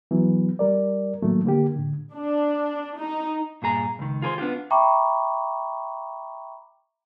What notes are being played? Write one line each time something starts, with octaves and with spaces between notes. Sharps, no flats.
E3 F#3 B3
G3 A#4 D5
A2 D#3 F#3 A3 A#3
D3 A#3 G4
A2 D3
D4
D#4
G2 A#2 G#4 A#5
C#2 D#3
F4 G#4 A#4 C5
B3 D4 F4 G4
E5 G5 A#5 B5 C#6 D6